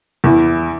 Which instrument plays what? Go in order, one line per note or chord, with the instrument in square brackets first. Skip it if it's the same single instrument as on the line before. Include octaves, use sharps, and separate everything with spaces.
[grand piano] E2 [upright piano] E4